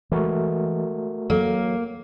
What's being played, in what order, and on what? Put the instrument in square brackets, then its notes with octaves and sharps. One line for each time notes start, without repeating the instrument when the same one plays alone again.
[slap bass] E3 G#3 [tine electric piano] A3 F#4 A#4
[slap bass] F#3 [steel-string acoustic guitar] A#3 [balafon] A4